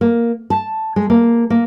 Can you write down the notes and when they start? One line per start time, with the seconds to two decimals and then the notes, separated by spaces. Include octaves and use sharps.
0.01 A#3
0.50 A5
0.96 G#3
1.10 A#3
1.50 A#3